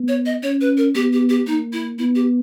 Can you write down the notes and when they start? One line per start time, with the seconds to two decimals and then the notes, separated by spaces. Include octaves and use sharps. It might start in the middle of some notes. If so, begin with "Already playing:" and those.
Already playing: B3
0.08 C#5
0.26 D#5
0.43 C#4 C#5
0.61 B4
0.77 A#4
0.95 B3 G4
1.13 G4
1.29 G4
1.47 A#3 D#4
1.73 E4
1.99 B3 E4
2.15 G4